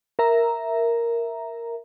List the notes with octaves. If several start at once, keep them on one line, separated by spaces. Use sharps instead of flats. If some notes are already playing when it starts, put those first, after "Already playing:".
A#4 E5 A#5